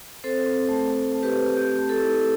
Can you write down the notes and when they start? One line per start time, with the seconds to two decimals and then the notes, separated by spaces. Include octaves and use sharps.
0.24 C4 A4 C5
0.46 C4
0.69 A3
0.91 A3
1.12 A3
1.23 G4 B4
1.34 C4
1.56 A3 G4
1.79 A3
1.89 A4
2.00 E4